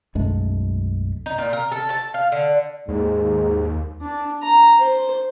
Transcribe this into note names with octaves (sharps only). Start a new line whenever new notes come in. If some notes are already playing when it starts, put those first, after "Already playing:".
B1 F#2 G#3 A3
D#4
A#2
A#4
A4
A5
F5
D3
D#2 G#2
D4
A#5
C5